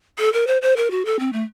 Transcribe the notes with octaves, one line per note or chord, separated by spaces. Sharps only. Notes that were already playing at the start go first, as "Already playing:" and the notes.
A4
A#4
C5
C5
A#4
F#4
A4
C4
A3